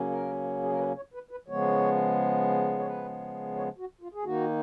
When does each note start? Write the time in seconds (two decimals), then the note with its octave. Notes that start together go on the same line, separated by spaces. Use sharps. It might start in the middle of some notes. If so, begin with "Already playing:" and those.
Already playing: C#3 F#3 A#3 C#4
0.10 A#4
0.63 G#4
0.71 A#4
0.79 B4
0.96 C#5
1.14 B4
1.31 B4
1.48 C#3 F3 G#3 B3 C#5
2.79 C#5
2.86 B4
3.56 C#5
3.78 F#4
4.01 F4
4.14 G#4
4.24 D#3 A#3 D#4 F#4